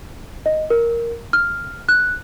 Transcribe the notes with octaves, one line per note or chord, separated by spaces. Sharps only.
D#5
A#4
F6
F#6